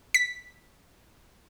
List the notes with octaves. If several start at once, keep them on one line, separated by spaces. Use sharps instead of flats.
B6